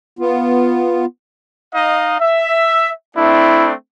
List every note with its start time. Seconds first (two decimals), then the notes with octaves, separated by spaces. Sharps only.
0.19 B3 F4
1.74 D#4 D#5 F5
2.21 E5
3.17 A3 C4 D4 E4